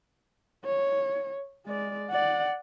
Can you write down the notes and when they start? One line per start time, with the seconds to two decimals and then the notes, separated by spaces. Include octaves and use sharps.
0.65 C#5
1.66 G#3 D5
2.10 D5 F#5